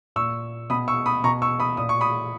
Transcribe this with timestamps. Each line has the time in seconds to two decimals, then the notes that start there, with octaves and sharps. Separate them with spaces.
0.16 A#2 C#6 E6
0.70 B2 B5 D#6
0.88 C#6 E6
1.06 B5 D#6
1.24 B2 A#5 C#6
1.42 C#6 E6
1.60 B5 D#6
1.77 A#2 D#6
1.89 C#6
2.01 B5 D#6